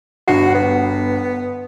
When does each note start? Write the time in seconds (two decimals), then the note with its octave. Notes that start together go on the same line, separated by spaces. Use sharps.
0.28 G1 F#4 C7
0.55 B3